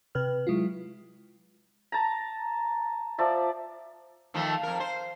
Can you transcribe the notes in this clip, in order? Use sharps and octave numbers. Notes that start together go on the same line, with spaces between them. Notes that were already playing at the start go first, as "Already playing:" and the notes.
C3 B4 F6
F#3 G#3 E4 F4
A5 A#5
F3 D5 E5
D#3 F3 A3
F2 A#4
C5